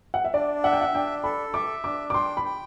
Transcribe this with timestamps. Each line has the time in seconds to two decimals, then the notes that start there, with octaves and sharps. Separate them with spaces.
0.14 F#5
0.24 E5
0.34 D4 D5
0.64 E5 F#5
0.73 G5
0.81 F#5
0.94 D4 G5
1.24 A4 B5
1.54 E5 D6
1.84 D4 D6
2.10 D6
2.14 G5 C6
2.37 B5
2.44 G5